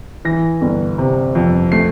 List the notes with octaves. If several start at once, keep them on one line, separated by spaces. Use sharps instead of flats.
E3 A#6
G1
C3
F2
A3 C7